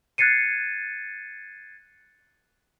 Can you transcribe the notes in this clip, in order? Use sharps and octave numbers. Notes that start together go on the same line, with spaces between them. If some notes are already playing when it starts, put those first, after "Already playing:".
F#6 G#6 A6 C7 C#7 D#7